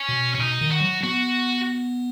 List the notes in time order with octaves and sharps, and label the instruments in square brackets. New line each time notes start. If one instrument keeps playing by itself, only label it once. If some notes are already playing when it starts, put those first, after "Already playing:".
Already playing: [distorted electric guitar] C#4
[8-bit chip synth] B2
[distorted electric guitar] C#4
[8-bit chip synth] B2 [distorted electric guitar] D#4
[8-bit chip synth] D#3
[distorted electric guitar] F#4
[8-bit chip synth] F#3
[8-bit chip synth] B3 [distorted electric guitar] F#4